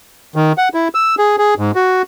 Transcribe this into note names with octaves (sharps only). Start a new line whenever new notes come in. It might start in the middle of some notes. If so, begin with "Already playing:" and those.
D#3
F#5
E4
E6
G#4
G#4
G#2
F#4